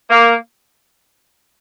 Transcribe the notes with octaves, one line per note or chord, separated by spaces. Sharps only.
A#3